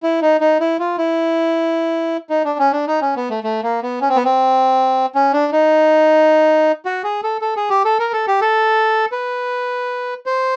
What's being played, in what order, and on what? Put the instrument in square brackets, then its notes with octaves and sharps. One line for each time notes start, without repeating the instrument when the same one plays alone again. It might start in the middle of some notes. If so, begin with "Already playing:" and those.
[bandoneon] E4
D#4
D#4
E4
F4
E4
D#4
D4
C#4
D4
D#4
C#4
B3
A3
A3
A#3
B3
C#4
C4
B3
C4
C#4
D4
D#4
F#4
G#4
A4
A4
G#4
G4
A4
A#4
A4
G4
A4
B4
C5